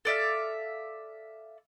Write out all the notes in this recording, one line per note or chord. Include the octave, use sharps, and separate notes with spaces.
A4 D5 E5 F5